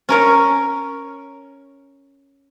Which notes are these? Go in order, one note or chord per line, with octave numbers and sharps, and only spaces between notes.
C#4 A#4 C#5